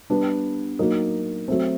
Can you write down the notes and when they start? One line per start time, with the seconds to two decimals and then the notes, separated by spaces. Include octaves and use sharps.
0.10 G3 B3 D4
0.79 F#3 A#3 D#4
1.48 F#3 A3 C4